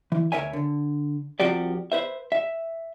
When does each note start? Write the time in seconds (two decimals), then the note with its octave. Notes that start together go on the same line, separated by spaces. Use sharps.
0.12 E3
0.32 D2 G3 A#4 C#5 E5 G#5
0.53 D3
1.40 C2 C3 F3 F#4 G4 D5
1.92 B4 C5 E5
2.32 E5